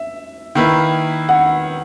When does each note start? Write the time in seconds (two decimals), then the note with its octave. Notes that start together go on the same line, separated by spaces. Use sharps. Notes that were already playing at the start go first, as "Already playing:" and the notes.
Already playing: E5
0.55 D#3 A#3 E4 B4
1.29 F#5